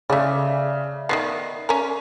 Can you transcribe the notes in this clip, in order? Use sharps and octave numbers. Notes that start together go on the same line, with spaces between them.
C#3 A3 C#4 D5 E5
D#3 F#3 B3 C7
C#4 A#4